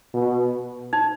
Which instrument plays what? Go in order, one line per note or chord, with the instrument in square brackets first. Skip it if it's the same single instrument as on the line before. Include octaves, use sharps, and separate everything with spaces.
[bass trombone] B2
[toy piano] D#4